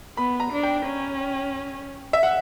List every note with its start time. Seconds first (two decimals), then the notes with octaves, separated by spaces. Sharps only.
0.17 B3 B5
0.40 A#5
0.52 D4
0.63 G5
0.85 C#4
2.13 E5
2.23 F#5